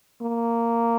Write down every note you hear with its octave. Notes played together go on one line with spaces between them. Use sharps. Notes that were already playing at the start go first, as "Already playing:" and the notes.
A#3